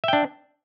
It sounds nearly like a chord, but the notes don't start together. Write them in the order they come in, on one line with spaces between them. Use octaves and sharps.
E5 G5 D4